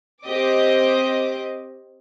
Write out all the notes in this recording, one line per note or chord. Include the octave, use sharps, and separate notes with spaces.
C4 G4 D#5 D6